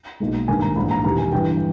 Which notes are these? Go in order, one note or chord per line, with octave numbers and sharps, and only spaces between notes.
B1 A#2 G#3
G#1 G2 D#3 A#3 G#5
A#5
A#1 G#2 E3 B5
A#5
E1 E2 D#3 G3 A#5
G#5
G1 G2 E3 G5